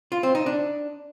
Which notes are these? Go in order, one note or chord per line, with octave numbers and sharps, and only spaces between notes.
F4
C4
D#4
D4